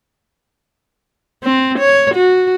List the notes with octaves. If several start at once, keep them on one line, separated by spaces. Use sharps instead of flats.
C4
C#5
F#4